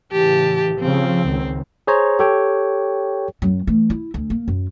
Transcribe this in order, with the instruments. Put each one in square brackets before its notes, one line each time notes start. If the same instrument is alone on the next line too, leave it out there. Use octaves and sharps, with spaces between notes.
[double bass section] A2 C#3 E3 [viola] G4 A5
[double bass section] C#3 F3 [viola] C4
[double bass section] C#2 D#3
[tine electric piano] G#4 C5 C#5 A#5
G4 A4 C#5 G5
[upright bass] F#2 F#3
E3 A3
E4
D2
A#3
F#2